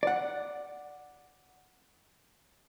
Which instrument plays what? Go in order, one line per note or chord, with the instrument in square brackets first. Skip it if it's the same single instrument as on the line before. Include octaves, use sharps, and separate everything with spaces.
[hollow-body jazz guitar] D5 F#5